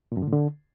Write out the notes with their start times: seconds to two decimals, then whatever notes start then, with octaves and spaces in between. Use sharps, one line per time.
0.12 A#2
0.17 F#2
0.22 D3
0.28 A2
0.33 D3